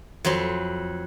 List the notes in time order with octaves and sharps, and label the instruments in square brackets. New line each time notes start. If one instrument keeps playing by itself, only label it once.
[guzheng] F2 F#3 B4 C6